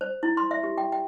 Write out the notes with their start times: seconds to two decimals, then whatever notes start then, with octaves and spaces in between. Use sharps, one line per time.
0.01 C5
0.23 E4
0.37 C6
0.51 E5
0.63 G4
0.78 G5
0.92 G5